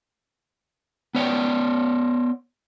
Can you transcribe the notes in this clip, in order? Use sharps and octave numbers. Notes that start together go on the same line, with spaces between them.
B3 C#5 D5 G5